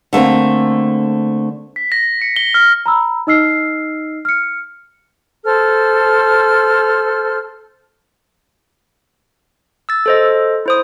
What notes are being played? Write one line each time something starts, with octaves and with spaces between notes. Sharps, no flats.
D3 A3 A#3 C4
B6
A#6
C#7
G7
F6
A#5 B5 E6
D#4 D#5 E6 F6 C7
F6 C#7
A4 C5 F6
E6 A6
A4 C5 D#5
E4 C5 D#6